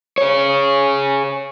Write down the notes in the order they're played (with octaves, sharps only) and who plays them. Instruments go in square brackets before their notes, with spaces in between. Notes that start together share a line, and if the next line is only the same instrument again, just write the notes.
[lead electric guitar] G#4 C#5